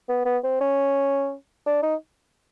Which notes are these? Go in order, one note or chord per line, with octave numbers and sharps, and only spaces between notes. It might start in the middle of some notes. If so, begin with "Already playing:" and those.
B3
B3
C4
C#4
D4
D#4